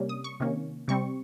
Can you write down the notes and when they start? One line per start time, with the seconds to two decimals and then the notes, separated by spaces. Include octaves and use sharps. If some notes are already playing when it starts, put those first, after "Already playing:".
Already playing: C3 G3 A#3 C#4
0.09 D#6
0.24 C#6
0.40 C3 D#3 A#3 C#4
0.88 C3 G3 C4 C#6